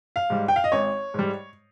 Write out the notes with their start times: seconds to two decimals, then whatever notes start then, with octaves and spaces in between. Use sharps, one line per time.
0.16 F5
0.30 G#2 G3
0.48 G5
0.56 F5
0.64 D#5
0.72 G#1 C#5
1.14 G#2 G3